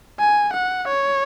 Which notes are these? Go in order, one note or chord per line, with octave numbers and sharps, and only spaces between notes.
G#5
F#5
C#5